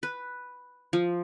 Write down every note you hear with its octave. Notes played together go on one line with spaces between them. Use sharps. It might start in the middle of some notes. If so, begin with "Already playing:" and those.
B4
F3